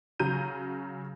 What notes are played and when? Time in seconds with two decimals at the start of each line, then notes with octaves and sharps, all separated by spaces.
0.20 C#3 F#3 A#5 G6 D#7